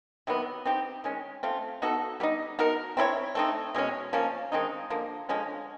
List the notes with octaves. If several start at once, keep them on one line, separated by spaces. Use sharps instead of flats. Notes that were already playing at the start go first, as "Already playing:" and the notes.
C3 D#3 F#3 B3
C4 D#4 G4
D#3 G#3 C#4
A3 C4 F4
B3 D#4 F#4 A4
G3 B3 D#4
B3 D#4 F#4 A#4
C4 E4 A4 C#5
A3 C4 D#4
B2 G#3 C#4
F3 A#3 C#4
D#3 G#3 C4 D#4
D3 F3 A#3
D3 F3 G#3 C#4